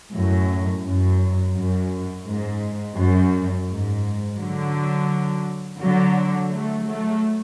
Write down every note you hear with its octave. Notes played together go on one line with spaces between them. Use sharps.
F#2 A2
F#2
F#2
G#2
F#2
G#2
D3 F#3
D3 F#3
F#3 A3
F#3 A3